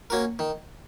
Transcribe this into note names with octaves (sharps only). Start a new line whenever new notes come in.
A#3 C#4 F#4 A#4
D#3